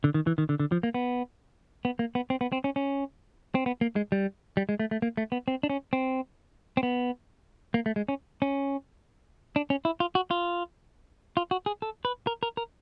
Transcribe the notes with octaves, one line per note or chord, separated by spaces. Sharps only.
D3
D#3
E3
D#3
D3
D3
F3
A#3
B3
B3
A#3
B3
C4
B3
C4
C#4
C#4
C4
B3
A#3
G#3
G3
G3
G#3
A3
A3
A#3
A3
B3
C4
D4
C#4
C4
C4
B3
A#3
A3
G#3
C#4
C#4
D4
C#4
E4
F4
F#4
F4
F4
F#4
G#4
A4
B4
A#4
A#4
A#4